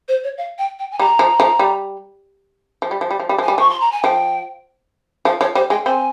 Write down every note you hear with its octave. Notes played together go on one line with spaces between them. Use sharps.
C5
C#5
F5
G5
G5
G#5
G3 A#5
F3
F3
G3
F3
G3
F3
G3
F3
G3
F3 G#5
G3
F3 C#6
C6
A#5
G#5
F3 G5
F3 F5
F3 C#5
G3 C5
G#3 G5
C4 G#5